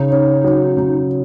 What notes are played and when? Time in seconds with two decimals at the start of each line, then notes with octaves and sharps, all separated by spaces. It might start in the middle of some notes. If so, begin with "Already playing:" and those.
Already playing: C#3 D#4
0.11 C#4
0.44 F#3
0.76 C#3